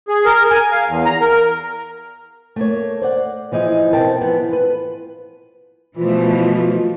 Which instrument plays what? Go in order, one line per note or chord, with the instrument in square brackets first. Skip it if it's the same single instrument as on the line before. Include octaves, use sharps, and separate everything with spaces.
[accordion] G#4
A#4
G#5
F5
E2
A#5
A#4
[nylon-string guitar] A3 A#3 C#5
C5 D5 F#5
E3 F3 D#4 E4 G#4
B2 C4 E4 A#4 G5 A5
E3 F3 B3
F4 B4
[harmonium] B2 F3 [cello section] E3 A3 [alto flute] F4